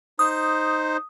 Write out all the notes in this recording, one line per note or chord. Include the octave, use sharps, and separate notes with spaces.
D#4 C5 D#6